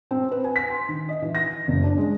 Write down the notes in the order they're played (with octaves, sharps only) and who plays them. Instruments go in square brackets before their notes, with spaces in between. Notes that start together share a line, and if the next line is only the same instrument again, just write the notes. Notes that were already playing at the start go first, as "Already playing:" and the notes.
[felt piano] C4
B4
G#5
B6
C6
D#3
D#5
E3
A#6
F#1
D4
G#3